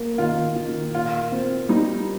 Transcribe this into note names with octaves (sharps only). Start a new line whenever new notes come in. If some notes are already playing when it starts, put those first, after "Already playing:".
Already playing: A#3
D#3 F4
D#3
A#2 F4
C4
G3 D#4